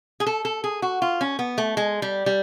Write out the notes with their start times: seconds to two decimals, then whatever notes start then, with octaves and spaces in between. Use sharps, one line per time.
0.20 G#4
0.27 A4
0.45 A4
0.64 G#4
0.82 F#4
1.02 F4
1.21 C#4
1.39 B3
1.58 A3
1.77 G#3
2.02 G3
2.26 G3